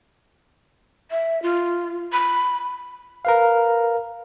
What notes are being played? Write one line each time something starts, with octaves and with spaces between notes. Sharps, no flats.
E5
F4
B5
A#4 B4 F5